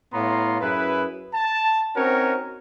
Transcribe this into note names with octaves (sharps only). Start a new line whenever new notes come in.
A2 B3 C#5 F5 A#5 C6
F#2 E4 G#4 B4
A5
C4 C#4 D#4 F#4 A#4 C#5